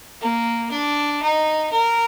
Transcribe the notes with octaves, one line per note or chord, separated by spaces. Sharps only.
A#3
D4
D#4
A#4